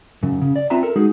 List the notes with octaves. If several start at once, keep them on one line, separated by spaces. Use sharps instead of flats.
F#2 C#3
C#3
D5
C4 F4 B4 E5 A5 A#5
A4 A#4
G#3 D#4 F#4 G#4